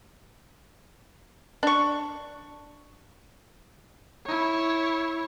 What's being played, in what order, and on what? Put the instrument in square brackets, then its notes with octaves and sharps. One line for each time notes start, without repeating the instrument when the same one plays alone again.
[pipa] D4 C#6
[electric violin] E4 C#5